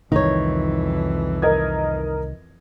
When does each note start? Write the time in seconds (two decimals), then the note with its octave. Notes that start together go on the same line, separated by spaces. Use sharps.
0.12 C2 F2 D#3 E3 D#4 C#5
1.42 A#4 D#5 G#6